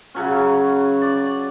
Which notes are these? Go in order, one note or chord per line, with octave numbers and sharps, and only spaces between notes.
C#3 F#3 C#4
D5